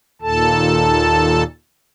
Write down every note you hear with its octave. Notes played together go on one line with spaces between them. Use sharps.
D#2 A#2 A4 A5